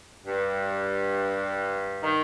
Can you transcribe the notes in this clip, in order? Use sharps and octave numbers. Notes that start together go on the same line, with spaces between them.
G2
D#3